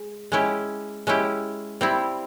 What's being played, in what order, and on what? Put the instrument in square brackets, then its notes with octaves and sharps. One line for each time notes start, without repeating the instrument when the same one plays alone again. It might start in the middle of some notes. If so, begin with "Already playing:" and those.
Already playing: [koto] G#3
G#3 C#4 E4 G4
G#3 C#4 E4 G4
G3 C4 E4